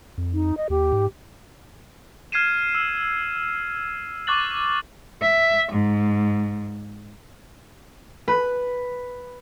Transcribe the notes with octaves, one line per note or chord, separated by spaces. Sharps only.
F2
D#4
D#5
D#2 G4
G#2
F6 G#6 C7 D#7 E7
E6
C#6 D6 F#6 A6 F#7
E5
G#2
B4